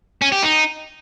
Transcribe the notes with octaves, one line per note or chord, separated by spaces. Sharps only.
C#4
G4
D#4